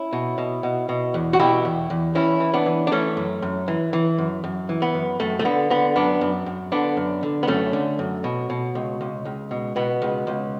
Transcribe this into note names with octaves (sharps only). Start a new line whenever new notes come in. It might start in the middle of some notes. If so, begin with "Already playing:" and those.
Already playing: C#4 E4
B2
B2
B2
B2
E2
F#4
B2 E4 G4
E2
E2
E3 C#4 E4
E3
B3 D4
E3
D4
E3 A3 C#4
F#2
F#2
E3
E3
F#2
F#2
E3
B3
F#2
F#2 A3
A3
D3 B3
D3 B3
F#2 B3 D4
F#2
F#2
D3 B3 D4
F#2
D3
B3
F#2 A3 C#4
D3
F#2
B2
B2
C#2
C#2
C#2
B2
B2 B3
C#2
C#2